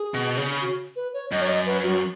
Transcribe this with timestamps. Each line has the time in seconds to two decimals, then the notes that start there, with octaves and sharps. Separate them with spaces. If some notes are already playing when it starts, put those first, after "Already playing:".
Already playing: G#4
0.14 B2
0.37 C#3
0.61 F#4
0.96 B4
1.14 C#5
1.31 F#2 D#5
1.42 C#5
1.49 D#5
1.66 B4
1.84 F#4